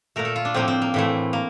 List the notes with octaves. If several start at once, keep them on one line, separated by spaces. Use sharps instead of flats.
A#2 A3 A#4
A4
F4
D4
A2 F3 A#3 C4
C4
A#3
A2 E3 A3
A#3